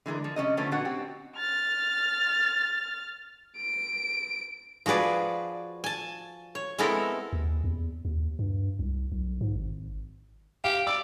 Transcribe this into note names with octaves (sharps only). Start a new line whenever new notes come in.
D3 E3 G#3 A#4
F3
C3 G#3 C#4 D#5
D3 F3 A3 B3 C#4
A#2 B3 D4 F#4 B4 F#5
C4 G4
F6 A6
D7
F3 F#4 G#4 B4 D5
G#5 A5
C#5
G#3 B3 C4 E4 A4 A#4
D#2
E2
D#2
G2
C2
B1
G#2
G#1
G4 F5
D5 E6